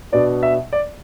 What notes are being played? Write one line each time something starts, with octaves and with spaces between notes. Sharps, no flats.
B2 B3 D4 D5
E5
D5